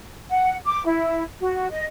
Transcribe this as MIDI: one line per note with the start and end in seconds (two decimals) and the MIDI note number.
0.30 0.55 78
0.66 0.84 86
0.86 1.22 64
1.41 1.70 66
1.71 1.85 75